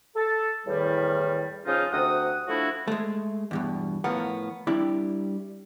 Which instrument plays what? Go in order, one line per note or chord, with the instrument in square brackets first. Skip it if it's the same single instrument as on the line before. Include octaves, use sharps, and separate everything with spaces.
[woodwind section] A4
E2 A2 D#3 G3
C#3 F3 C#4 D#4 F4
D2 C3 A4 F#5 D#6
F3 A3 D4 E4 F#4
[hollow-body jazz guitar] G#3 A3
E2 G2 B2
A2 F3 B3 A#4 F5 F#5
G3 C4 D4 E4